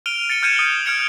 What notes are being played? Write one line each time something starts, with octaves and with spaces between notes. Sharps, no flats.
F6 D7 D#7 F7 G7
A6 C#7 D#7 G7
F6 G6 G#6 C#7 D#7 E7
D#6 F#7
F6 G6 G#6 C#7 D7 F7